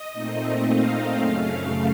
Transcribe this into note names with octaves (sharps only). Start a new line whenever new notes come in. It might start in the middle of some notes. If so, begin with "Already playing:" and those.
Already playing: D#5
A#2 A3 C4 D#4
F5
F#2 C#3 A3